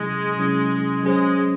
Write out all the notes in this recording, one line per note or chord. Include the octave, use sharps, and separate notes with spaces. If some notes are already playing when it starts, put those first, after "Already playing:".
Already playing: C3 F#3 G#3 C#4 E4
C3 F#3 C#4 E4
F#3 G#3 C#4 G#4 C5